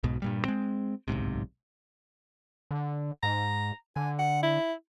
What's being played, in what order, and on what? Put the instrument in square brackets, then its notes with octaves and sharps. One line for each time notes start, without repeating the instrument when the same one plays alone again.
[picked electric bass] B1 G#2 B2
G2 A#2 G3
G#3 C4
D1 B1 G#2 C3
[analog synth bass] D3
[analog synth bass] G#2 [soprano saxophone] A#5
[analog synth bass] D3 [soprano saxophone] G#5
[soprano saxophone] F#5
E4